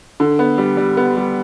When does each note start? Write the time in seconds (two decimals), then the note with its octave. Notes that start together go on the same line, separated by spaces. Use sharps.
0.20 D3
0.39 B3
0.58 G3
0.77 G3
0.97 B3
1.17 G3